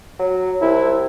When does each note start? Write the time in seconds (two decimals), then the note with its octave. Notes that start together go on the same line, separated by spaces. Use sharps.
0.19 F#3
0.62 C2 E4